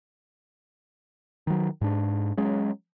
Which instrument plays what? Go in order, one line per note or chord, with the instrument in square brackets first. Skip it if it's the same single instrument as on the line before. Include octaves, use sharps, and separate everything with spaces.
[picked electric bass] D#3 F#3
G#2 D4
F#3 G#3 C#4